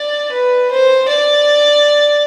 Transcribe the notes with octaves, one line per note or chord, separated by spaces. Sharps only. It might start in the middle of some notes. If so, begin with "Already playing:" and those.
Already playing: D5
B4
C5
D5